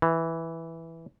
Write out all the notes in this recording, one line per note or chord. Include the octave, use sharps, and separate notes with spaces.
E3